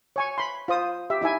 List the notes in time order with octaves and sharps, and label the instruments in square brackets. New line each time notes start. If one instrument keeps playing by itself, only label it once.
[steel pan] C#5 G#5 C#6
B5 C6
F4 C5 D#6
G4 E5
D#4 E4 E5 G#5